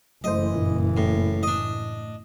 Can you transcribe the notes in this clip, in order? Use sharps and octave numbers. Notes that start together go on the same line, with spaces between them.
F#1 E3 F#3 A3 C5 D#5
G2 A#2
A2
A2 D4 D#5